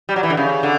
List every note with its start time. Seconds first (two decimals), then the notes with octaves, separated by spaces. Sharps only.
0.09 G3
0.16 F#3
0.23 E3
0.30 D3
0.37 C#3
0.63 D3